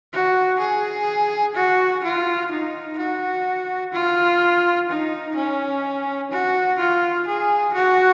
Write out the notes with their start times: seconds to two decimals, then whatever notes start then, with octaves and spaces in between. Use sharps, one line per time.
0.13 F#4
0.60 G#4
1.55 F#4
2.03 F4
2.51 D#4
2.98 F#4
3.93 F4
4.88 D#4
5.36 C#4
6.31 F#4
6.79 F4
7.27 G#4
7.74 F#4